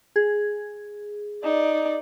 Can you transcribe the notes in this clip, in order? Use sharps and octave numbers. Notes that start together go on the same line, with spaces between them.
G#4
D#4 D5